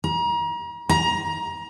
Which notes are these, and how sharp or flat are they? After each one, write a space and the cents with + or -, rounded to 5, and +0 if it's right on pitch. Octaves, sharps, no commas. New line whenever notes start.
A#5 +35
A#5 +20